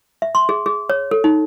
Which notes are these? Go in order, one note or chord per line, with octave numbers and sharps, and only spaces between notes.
E5
C6
G#4
G#4
C#5
A4
D#4